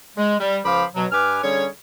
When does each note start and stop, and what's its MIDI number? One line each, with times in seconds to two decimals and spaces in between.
0.17 0.35 56
0.40 0.59 55
0.65 0.84 37
0.65 0.84 53
0.65 0.84 72
0.65 0.84 77
0.65 0.84 83
0.65 0.84 86
0.96 1.06 47
0.96 1.06 54
1.12 1.40 43
1.12 1.40 71
1.12 1.40 80
1.12 1.40 86
1.12 1.40 89
1.43 1.67 50
1.43 1.67 55
1.43 1.67 61
1.43 1.67 68
1.43 1.67 73